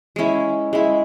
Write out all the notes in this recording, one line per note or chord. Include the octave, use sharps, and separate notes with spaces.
G#3 C#4 E4
G#3 C#4 E4